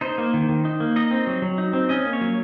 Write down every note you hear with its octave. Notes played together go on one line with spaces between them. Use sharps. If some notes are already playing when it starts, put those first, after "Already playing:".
D#4 C5
A#3
D#3
D#3
D#4
A#3
D#4 D#5
C4
F#3
F#3
D#4
C4
C#4 D#5
A#3
C#5
F#3